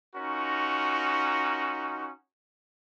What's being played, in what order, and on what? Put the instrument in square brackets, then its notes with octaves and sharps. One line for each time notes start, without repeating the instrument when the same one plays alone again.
[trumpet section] C#4 D#4 F4 F#4 A#4